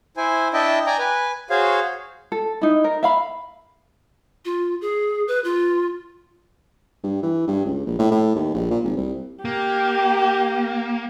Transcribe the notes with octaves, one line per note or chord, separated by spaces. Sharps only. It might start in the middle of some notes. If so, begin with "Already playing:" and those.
E4 C5 G#5
D4 E4 D#5 E5 G5 A5
D5 G5 G#5 A#5
B4 G#5
F#4 G#4 C5 C#5 F5
A4
D#4 E4
A#4
E5 F5 B5
F4
G#4
B4
F4
G2
E3
G2
C#2
A#1
A2
A2
D#2
A#1
A#2
G#1
C2
A#3 G4